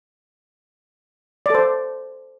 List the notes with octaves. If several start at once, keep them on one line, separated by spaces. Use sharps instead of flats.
A4 C5 D5